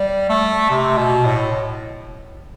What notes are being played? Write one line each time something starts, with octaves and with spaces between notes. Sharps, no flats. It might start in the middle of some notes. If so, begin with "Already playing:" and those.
Already playing: G3
A3
C3
B2
A2